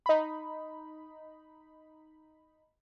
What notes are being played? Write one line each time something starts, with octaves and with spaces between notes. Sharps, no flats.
D#4 B5